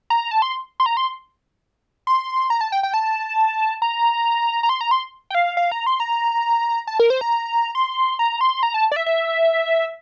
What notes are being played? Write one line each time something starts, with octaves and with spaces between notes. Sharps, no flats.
A#5
A5
C6
C6
A#5
C6
C6
A#5
A5
G5
G5
A5
A#5
A#5
C6
A#5
C6
G5
F5
F5
A#5
C6
A#5
A5
A#4
C5
A#5
C6
A#5
C6
A#5
A5
D5
E5
E5